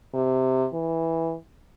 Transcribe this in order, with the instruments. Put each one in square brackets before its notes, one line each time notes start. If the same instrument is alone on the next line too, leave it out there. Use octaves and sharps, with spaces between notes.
[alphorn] C3
E3